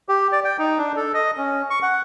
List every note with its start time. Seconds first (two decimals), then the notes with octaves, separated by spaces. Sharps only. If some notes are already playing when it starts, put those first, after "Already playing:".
0.09 G4
0.32 D5
0.45 G5
0.59 D#4
0.78 D4
0.96 A4
1.14 D#5
1.37 C#4
1.70 C#6
1.82 F#5